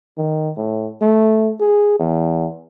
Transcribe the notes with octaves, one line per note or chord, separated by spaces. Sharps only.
D#3
A2
A3
G#4
E2